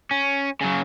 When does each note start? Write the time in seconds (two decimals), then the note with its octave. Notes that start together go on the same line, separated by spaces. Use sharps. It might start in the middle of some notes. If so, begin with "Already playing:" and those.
0.11 C#4
0.61 C#3 F#3